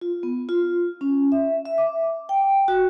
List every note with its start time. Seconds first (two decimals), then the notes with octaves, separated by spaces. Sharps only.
0.01 F4
0.23 B3
0.49 F4
1.01 C#4
1.32 E5
1.66 E5
1.78 D6
2.29 G5
2.68 F#4